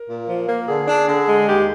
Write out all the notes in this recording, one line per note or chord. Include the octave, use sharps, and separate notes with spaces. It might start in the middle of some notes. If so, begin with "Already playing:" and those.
Already playing: A#4
A#2
F3
A#3
D3 G#4
D4
D3
G#3
D#2 G4